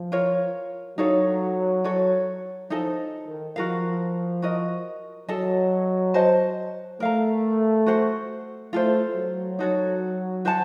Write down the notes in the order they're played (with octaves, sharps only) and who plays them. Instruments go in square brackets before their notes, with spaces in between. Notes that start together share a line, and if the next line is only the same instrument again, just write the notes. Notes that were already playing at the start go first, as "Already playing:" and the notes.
Already playing: [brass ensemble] F3
[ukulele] F4 A#4 C#5
[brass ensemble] F#3 [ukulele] D#4 A4 C#5 F5
[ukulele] F#4 A4 C#5
[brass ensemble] F3 [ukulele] D#4 A4 D#5 A5
[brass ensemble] D#3
[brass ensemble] F3 [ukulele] F#4 A#4 F5
[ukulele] F#4 A#4 D#5
[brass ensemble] F#3 [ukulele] A4 D#5 A5
[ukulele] F#4 C5 D#5 A5
[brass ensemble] A3 [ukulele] A#4 F5 A#5
[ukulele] F#4 C5 F#5
[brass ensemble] A3 [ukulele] F4 A4 C5
[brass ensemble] F#3
[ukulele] D#4 F#4 A4 C#5
F#4 C5 F#5 A5